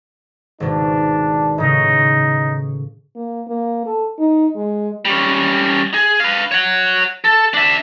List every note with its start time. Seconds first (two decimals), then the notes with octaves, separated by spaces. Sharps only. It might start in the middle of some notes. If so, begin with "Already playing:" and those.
0.60 G#1 B2 D4
1.58 A2 C#3 D#4
3.16 A#3
3.47 A#3
3.86 A4
4.19 D#4
4.56 G#3
5.05 G3 C#4
5.94 G#4
6.20 B4 F5
6.51 C#5 F#5
7.24 A4
7.54 D4 E5